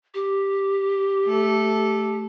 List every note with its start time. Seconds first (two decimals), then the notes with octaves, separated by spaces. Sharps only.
0.14 G4
1.26 A3 A4